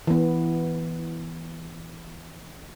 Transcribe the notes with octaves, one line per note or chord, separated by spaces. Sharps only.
E3 B3